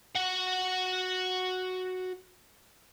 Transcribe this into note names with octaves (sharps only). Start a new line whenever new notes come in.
F#4 F#5